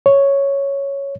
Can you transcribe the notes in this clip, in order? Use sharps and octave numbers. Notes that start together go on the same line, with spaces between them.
C#5